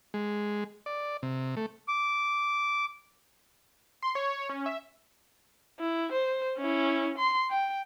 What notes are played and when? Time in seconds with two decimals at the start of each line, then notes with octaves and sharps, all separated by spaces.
0.14 G#3
0.86 D5
1.23 C3
1.57 A3
1.88 D6
4.03 C6
4.15 C#5
4.33 C#5
4.49 C#4
4.66 E5
5.79 E4
6.12 C5
6.58 C#4 E4
7.18 C6
7.50 G5